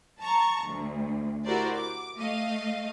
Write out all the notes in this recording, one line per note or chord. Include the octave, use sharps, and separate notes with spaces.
A5 A#5 C#6
D2
E4 F#4 G4 A#4 C5 D5
D6
A3 D#5 F5